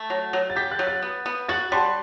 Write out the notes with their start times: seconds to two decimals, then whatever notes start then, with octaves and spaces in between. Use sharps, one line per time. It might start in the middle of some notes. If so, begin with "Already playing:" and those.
Already playing: A3
0.10 F#3
0.33 F#3
0.50 A6
0.56 G4 G6 B6
0.71 F#6 A6
0.79 F#3
0.87 F#6 A6
1.02 B3
1.26 B3
1.49 F#4 F#6 A6
1.72 G3 A5 C6